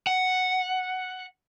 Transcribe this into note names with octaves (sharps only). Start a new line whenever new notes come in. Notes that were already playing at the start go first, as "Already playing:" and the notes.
F#5